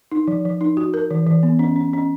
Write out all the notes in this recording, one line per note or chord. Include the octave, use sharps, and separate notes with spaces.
D#4
F3
F3
D#4
F#4
A#4
E3
E3
B3
C#4
C#4
C#4